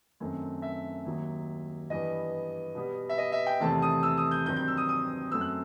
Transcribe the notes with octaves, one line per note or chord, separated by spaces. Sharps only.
F#2 D#3 A3 C4
E5
D#2 D#3 F#3
G2 E3 B3 D#5
B2 G3 B3
E5
D#5
E5
G5
E2 C3 D#3 A3 C4 A5
D#6
E6
D#6
G6
G2 D#3 F#3 C4 G6
G6
E6
D#6
D#6
F#2 F#3 A3 C4 E6
F#6